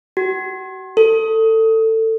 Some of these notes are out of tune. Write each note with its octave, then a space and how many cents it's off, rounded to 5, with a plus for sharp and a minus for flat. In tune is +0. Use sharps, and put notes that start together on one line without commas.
F#4 +40
A4 +20